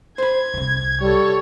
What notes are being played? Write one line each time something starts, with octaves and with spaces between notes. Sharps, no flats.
C5 B5 G#6
C2 C3
G3 A4 C#5